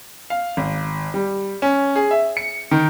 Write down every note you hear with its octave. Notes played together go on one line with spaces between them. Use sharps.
F5
G#1
G3
C#4
G#4
E5
C#7
D#3